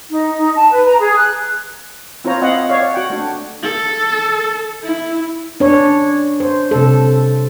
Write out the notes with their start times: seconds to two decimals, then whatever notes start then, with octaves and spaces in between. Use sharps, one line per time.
0.09 D#4
0.36 D#4
0.54 A5
0.70 B4
0.85 A#5
0.99 G#4
1.16 F#6
2.24 C4 E4 F4 C5 C#5 A#5
2.42 C4 D#5 F5 F#5
2.69 C#5 D5 F5
2.94 F#4 F#5 G5
3.10 A3 D4
3.63 A4
4.83 E4
5.60 D4 C#5
6.40 C5
6.71 C3 A4